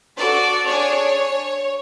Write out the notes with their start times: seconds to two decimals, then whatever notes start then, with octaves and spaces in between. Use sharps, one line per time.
0.17 D4 F#4 A4 D5
0.66 D4 G#4 C#5